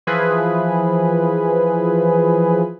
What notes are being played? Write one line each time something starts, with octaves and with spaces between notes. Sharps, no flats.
E3 F3 G#4 B4